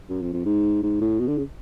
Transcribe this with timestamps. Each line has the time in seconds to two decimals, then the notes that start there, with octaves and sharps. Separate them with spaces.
0.09 F#2
0.22 F2
0.33 F2
0.45 G#2
0.83 G#2
1.01 A2
1.19 B2
1.28 D3
1.38 C#3